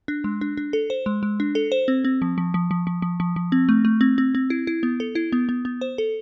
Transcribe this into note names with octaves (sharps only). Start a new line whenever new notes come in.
D4
G#3
D4
D4
A4
C5
G#3
G#3
D4
A4
C5
C4
C4
F3
F3
F3
F3
F3
F3
F3
F3
C4
A3
A3
C4
C4
C4
E4
E4
B3
A4
E4
B3
B3
B3
C5
A4